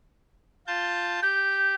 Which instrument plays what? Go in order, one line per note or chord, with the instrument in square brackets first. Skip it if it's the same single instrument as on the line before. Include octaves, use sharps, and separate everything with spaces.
[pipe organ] F4 A5 G6
[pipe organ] G4 [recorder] G6